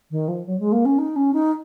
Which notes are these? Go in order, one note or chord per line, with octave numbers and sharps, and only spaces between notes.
D#3
F3
F#3
G#3
A#3
C#4
D#4
C#4
D#4